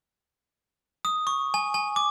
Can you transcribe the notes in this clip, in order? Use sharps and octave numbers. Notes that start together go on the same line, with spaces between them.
D#6
C#6
G#5
G#5
D6